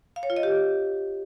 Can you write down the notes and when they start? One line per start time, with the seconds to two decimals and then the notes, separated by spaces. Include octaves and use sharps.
0.16 F5
0.23 C#5
0.30 F4
0.36 D#5
0.43 G4